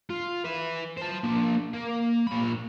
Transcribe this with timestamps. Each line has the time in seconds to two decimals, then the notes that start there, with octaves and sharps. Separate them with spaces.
0.10 F4
0.44 B4 E5
0.97 C5 A5
1.24 A#3 D4
1.73 A#3
2.27 A#2 B5